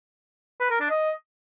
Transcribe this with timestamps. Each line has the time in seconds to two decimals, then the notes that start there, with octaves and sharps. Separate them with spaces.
0.61 B4
0.70 A#4
0.80 D4
0.90 D#5